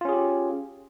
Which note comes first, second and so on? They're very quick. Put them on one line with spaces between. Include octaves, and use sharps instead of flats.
F4 C#4 G#4 G4